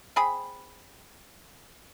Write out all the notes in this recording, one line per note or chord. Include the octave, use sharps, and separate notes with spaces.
C4 G#4 B5